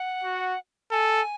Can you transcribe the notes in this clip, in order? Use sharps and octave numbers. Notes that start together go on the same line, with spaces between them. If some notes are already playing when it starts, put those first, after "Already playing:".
Already playing: F#5
F#4
A4 G#5